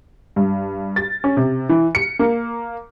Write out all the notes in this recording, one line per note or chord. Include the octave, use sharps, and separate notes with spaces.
G2
A6
C#4
C3
E3
C#7
A#3